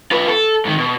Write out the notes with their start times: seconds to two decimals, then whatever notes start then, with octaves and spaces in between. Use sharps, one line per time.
0.11 F4 B4
0.28 A4
0.65 G#2 D#3
0.78 B2